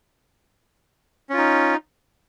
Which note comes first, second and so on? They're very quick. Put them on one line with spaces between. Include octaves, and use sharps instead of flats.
C#4 F4 D#4